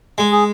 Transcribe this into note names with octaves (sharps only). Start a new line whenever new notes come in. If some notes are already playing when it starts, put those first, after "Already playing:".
G#3
G#4